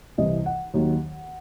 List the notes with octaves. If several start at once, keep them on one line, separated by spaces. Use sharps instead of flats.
C2 C3 E3 D#5
F#5
D#2 D#3 F#3